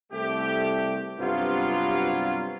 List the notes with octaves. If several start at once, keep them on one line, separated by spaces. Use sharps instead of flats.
C2 A3 G4
G2 C3 F#3 B3 C4 F4